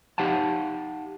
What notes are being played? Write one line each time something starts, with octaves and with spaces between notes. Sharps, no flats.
D#4 G4 F5 F#5 A5